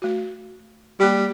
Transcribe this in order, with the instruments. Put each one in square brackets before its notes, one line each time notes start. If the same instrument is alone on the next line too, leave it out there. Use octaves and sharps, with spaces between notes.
[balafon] A3 F#4
[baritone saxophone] G3 [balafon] A#3 G4